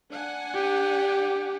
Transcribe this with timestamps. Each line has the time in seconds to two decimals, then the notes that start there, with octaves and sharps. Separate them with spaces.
0.10 D4 F#5 G#5
0.54 G4